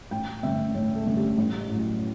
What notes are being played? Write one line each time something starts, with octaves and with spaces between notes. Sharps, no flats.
A1 G5
G2 D3 A3 C#4 E5
A1 C#5
A4
G2 D3 A3 C#4
G4
A1
A2 F#3